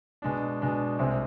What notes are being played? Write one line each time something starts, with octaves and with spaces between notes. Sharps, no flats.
B2 G#3 D4
B2 G#3 D4
C2 C3 G#3 C4